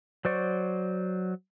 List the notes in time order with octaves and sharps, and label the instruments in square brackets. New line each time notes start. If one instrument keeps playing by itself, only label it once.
[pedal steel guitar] F#3 C5 D5 C#6